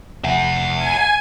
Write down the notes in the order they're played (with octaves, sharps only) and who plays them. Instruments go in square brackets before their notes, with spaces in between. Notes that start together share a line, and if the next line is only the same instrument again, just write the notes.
[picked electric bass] F1 [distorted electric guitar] E5 F#5
[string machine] G#5